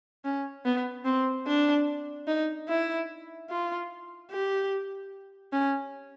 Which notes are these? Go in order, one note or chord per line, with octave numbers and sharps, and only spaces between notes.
C#4
B3
C4
D4
D#4
E4
F4
G4
C#4